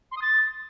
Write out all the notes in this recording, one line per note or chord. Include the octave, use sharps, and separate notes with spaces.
C6
D#6
A6